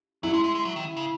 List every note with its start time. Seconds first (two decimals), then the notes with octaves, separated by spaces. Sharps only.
0.23 F#3 E4
0.34 G#3
0.44 G#3
0.55 G#3
0.65 F#3
0.76 D#3
0.97 C#3